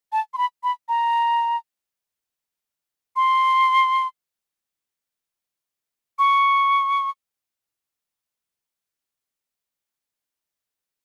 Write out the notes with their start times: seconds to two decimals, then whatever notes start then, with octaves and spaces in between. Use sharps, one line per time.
0.12 A5
0.34 C6
0.38 B5
0.63 B5
0.89 A#5
3.16 C6
6.19 C#6